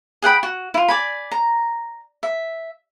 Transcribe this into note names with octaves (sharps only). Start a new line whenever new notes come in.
G#4 F#5 G5 B5
F#4
E4 F4
D5 G#5 B5
A#5
E5